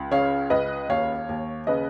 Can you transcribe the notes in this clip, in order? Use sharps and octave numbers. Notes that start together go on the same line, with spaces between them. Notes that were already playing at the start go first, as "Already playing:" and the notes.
Already playing: C#2
C#3 C#5 F5
C#2 B4 D#5
D#2 C#5 F5
D#2
C#3 B4 D#5